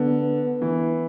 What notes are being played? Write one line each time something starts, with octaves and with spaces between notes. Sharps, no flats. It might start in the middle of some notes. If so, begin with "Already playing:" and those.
Already playing: D3 B3
E3